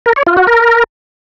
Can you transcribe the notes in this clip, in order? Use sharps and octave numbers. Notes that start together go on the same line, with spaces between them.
A#4
C#5
F4
F#4
A#4